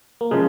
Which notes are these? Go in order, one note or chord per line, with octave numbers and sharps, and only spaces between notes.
A#3
C#3 F3 G#3